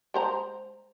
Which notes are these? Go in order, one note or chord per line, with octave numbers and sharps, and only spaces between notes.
G#3 C5 A#5